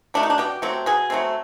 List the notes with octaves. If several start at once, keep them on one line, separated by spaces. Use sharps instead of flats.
F#3 A3 D4
D#4
D4
B2 G4
F#3 A3 C4
B2 G#4
F#3 A3 C4